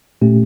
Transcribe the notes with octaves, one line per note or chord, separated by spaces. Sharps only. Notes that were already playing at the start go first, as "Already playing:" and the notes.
A#2 A3 C#4 G4